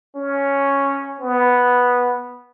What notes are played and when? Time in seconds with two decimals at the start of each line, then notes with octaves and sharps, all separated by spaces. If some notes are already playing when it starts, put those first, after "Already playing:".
0.15 C#4
1.20 B3